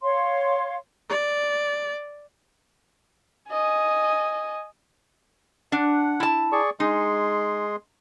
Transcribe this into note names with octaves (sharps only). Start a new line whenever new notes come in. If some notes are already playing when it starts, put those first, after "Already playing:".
C#5 F5 C6
D5
D#5 G#5
D4 F#5
E4 A5
G#4 D5 C#6
G#3 D#4 G#4 C6